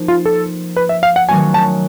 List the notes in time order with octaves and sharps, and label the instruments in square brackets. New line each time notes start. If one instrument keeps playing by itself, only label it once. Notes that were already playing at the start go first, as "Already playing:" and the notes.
Already playing: [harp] F3 A#3 D#4
[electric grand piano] F4
A4
B4
E5
F5
F#5
[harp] D#3 F#3 A3 C#4 F#4 [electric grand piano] G#5
[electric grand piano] A5